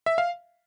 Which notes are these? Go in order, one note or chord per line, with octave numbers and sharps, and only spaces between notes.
E5
F5